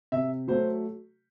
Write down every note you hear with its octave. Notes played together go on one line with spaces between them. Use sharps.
C3 E5
F#3 A3 C5